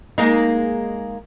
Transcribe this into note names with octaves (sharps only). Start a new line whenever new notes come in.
G#3 A#3 D#4